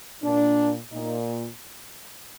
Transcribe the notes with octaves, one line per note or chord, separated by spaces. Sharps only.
A#2 D4
A#2 D#4